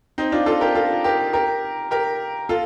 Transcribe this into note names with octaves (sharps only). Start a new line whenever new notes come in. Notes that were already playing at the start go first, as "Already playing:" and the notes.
C4 D#4
D4 F4
F4 A4
G4 A#4
F4 A4
G4 A#4
G4 A#4
G4 A#4
F4 A4